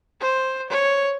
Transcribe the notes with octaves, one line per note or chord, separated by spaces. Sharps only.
C5
C#5